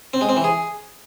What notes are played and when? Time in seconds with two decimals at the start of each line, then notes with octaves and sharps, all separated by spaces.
0.14 C4
0.21 G#3
0.29 C4
0.36 E3
0.44 G#4